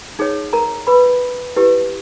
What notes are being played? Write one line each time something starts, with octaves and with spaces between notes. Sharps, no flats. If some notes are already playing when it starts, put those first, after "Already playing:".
D#4 G#4 C#5
A#4 A#5
B4 B5
E4 G4 B4